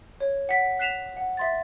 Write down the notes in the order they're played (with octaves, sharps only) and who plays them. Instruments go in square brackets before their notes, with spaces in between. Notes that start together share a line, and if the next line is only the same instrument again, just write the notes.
[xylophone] C#5
F#5 B6
F#6 B6 C7 E7 F7
F#5
E5 C6 A6